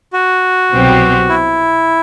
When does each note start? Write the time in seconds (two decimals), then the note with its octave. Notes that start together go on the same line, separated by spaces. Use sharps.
0.13 F#4
0.72 C2 B2 F#3 C4 G4
1.29 E4